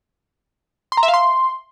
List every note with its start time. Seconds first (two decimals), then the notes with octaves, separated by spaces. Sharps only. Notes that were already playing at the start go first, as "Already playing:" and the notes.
0.92 C6
0.97 A#5
1.03 E5
1.08 F5
1.14 C6